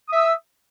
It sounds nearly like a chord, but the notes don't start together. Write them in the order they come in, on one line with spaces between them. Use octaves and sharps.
D#6 E5 E6